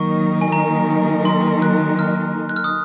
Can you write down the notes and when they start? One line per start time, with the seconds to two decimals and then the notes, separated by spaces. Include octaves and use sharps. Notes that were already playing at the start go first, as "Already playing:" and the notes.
Already playing: D#3 F#3 A#3 D#4 A#4 C#6
0.41 G#5
0.52 A#5
1.25 C6
1.62 F#6
1.99 F6
2.49 F#6
2.56 F6
2.64 D#6